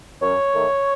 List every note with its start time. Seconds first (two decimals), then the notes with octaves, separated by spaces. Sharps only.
0.22 F#2 C#5
0.55 D#3 A3